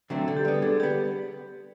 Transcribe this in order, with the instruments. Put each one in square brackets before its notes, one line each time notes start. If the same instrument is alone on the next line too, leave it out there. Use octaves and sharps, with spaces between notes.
[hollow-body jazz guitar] D3 F#3 A3 C4
[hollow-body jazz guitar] D3 [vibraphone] A4
[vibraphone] G4
[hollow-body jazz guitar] G3 B3 [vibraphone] G#4
[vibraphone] A4
[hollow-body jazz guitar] D3 [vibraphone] G#4
[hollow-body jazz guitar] G3 B3 [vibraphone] G4